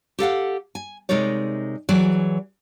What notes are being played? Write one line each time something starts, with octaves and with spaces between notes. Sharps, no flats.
G4 A4 F5 F#5
G#5
C3 G#3 D#4 A#4 C#5 D5
E3 F#3 G#4 D5